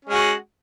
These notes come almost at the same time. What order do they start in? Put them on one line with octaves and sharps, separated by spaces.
C#4 G#3 F#4